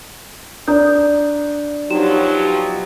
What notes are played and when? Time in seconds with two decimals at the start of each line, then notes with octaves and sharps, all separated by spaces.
0.68 D4 A#5 D#6 G6
1.90 B2 F3 F#3 D#4 F#4 G4 E7